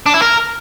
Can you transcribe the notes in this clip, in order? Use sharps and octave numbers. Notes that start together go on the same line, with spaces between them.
D4
E4
A#4